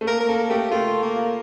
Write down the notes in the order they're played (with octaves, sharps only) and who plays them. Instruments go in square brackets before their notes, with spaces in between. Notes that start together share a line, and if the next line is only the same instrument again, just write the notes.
[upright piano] A3
[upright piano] A#3 [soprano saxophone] A#4
[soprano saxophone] A#4
[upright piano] A#3 [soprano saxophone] A4
[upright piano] A3 [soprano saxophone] G4
[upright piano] A3 [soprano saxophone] F4
[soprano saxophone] A#3